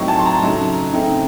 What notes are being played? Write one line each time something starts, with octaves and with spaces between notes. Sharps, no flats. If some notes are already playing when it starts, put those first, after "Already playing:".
Already playing: A2 F#3 C4 D#4 C#6
A5
C6
A#5
C#3 F#3 A3 D#4
C#3 A3 C4 D#4